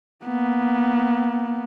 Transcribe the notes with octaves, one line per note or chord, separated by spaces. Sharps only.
A#3 B3